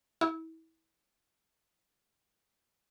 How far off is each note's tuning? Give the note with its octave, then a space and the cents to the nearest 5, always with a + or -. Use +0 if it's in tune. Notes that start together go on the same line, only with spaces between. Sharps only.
E4 -30